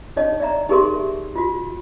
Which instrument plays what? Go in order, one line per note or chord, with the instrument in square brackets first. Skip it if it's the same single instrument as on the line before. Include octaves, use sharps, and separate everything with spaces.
[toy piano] D4 D#4 C#5 D#5 A5
D5 E5 A#5
D#4 G4 G#4 A#4 E5 C6
F4 F#4